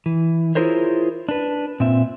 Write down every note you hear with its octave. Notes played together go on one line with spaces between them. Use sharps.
E3
E4 F4 G#4 A#4 C5 C#5
D4 B4
A#2 C4 E5